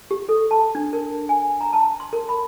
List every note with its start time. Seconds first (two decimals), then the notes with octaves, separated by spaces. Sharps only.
0.11 G4
0.29 A4
0.51 A5
0.75 D4
0.93 A#4
1.29 G#5
1.61 A#5
1.73 A5
2.00 C6
2.13 A#4
2.29 B5